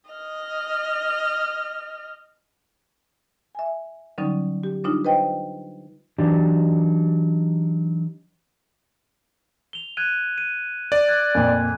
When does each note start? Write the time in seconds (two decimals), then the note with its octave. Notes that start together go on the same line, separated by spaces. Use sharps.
0.10 D#5 F6
3.55 E5 G#5
4.18 D3 F#3 G3 C#4 D#4
4.64 G4
4.84 G3 D4 D#4 F4
5.05 B4 C5 D#5 G5
6.18 E3 F#3 D4 D#4 G4 D5
9.73 F7 G7
9.97 F#6 G#6 D#7
10.38 D#7
10.92 D5
11.08 F#6 G#6
11.35 F2 A#2 G#5